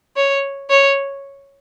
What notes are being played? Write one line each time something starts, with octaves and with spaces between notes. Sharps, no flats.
C#5
C#5